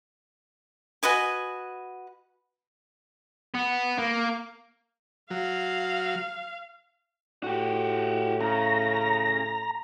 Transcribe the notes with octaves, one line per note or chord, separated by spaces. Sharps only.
F#4 B4 D#5 G#5
B3
A#3
F#3 F5
A2 F#4 G4
C#3 A#5